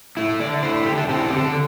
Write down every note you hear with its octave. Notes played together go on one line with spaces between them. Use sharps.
A3 E4
D3 D5
A3 E4 C5
D3 G4
A4
C4 E4 G4
A4
G4
D3
A4